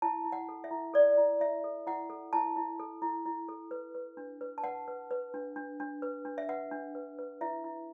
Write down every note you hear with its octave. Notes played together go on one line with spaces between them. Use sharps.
E4 A5
E4
F#5
A4
E5
E4
A4 D5
E4
E4 E5
A4
E4 F#5
A4
E4 A5
E4
A4
E4
E4
A4
B4
B4
D4
B4
A5
B4 F#5
B4
B4
D4
D4
D4
B4
D4
E5
B4 F#5
D4
B4
B4
E4 E5
E4